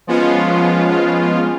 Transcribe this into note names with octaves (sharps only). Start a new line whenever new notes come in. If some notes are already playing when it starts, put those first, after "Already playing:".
F3 G#3 B3 C#4 F4